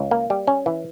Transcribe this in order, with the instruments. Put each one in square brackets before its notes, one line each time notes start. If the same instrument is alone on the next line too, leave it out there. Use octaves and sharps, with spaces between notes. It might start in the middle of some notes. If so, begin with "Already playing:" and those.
Already playing: [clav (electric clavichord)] C#2
A#3
G3
C#4
E3